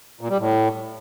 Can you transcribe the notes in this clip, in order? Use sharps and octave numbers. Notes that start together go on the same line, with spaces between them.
A#2
G3
A2